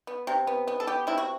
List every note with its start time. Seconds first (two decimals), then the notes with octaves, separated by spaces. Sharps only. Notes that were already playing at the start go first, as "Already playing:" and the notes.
0.07 B3
0.27 C3
0.47 B3
0.68 B3
0.80 A4
0.87 B3 G4
1.07 C3 E4
1.18 F#4